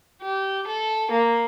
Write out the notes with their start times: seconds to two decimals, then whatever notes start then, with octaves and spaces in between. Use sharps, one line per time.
0.22 G4
0.67 A4
1.11 A#3